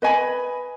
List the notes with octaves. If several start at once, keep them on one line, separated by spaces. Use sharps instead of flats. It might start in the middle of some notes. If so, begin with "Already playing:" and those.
B4 D#5 G#5 B5